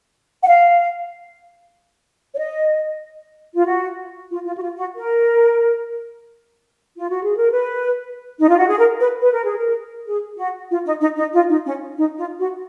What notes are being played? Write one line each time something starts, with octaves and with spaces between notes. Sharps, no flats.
F#5
F5
C#5
D#5
F4
F#4
F4
F4
F#4
F4
F#4
A#4
F4
F#4
G#4
A#4
B4
D#4
F4
F#4
G#4
A#4
B4
B4
A#4
G#4
A#4
G#4
F#4
F4
D#4
D#4
D#4
F4
D#4
C#4
D#4
F4
F#4